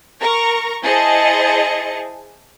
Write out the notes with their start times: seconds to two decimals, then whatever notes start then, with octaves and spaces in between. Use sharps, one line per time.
0.20 A#4 A#5 C#6
0.83 E4 G#4 C5 D#5 A5 C#7